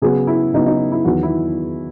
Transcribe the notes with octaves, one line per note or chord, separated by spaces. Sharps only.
C#3 F#3 B3 G#4
E4
C#3 F#3 B3 D#4
D#4
E4
E2 D#3 F#3 B3 F#4
E4